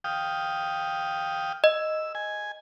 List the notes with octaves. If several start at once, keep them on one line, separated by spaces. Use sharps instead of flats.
F5 G5 D#6
D#5 E6
G#5